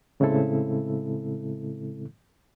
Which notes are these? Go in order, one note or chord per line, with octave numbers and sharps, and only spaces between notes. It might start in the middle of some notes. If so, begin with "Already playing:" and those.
A2 C#3 G#3 C4 E4 A4